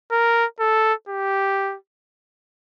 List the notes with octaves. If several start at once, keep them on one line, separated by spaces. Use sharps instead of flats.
A#4
A4
G4